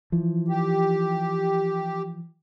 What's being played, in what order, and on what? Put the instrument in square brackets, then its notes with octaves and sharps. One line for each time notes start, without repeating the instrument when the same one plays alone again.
[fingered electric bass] E3 F3
[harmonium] G4